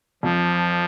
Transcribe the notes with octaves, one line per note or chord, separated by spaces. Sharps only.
F2 F3